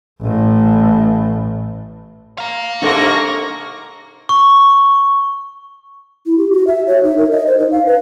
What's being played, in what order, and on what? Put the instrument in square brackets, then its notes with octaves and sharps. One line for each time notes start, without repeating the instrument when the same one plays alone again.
[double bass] A1 A2
[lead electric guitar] F5 A#5
[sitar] G#2 C3 A#3 [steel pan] D4 A4 C6 [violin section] C#6 A#6
[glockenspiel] C#6
[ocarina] E4
G4
F#4
E5
C#5
D#4
A#4
D#5
C5
D#4
F5
B4